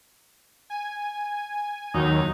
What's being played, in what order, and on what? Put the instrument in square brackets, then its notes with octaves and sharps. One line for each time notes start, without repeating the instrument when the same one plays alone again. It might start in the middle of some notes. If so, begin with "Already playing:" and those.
[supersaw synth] G#5
[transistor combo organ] D#2 [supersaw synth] F#3 [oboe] D#4